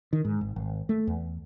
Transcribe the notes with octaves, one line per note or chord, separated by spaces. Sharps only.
D#3
G#2
G#1
G#1
A3
E2